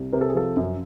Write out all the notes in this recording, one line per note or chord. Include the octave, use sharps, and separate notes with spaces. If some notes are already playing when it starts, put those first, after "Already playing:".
Already playing: C2
C3 A#4
A4
G#4
F3 A4
F#2